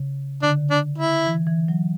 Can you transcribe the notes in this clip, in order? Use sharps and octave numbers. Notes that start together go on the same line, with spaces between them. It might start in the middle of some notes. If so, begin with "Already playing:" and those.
Already playing: C#3
D3 D4
D4
E4
E3
E3
F#3